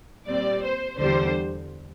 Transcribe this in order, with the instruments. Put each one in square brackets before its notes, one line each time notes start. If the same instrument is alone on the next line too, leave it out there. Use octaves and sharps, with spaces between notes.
[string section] A#2 G3 C4 D5
C5
E2 D3 G3 C5